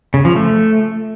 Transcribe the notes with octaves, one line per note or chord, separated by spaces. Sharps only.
C#3
F3
A3